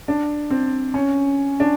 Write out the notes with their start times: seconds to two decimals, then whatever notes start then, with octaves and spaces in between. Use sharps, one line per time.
0.08 D4
0.50 C4
0.94 C#4
1.60 D4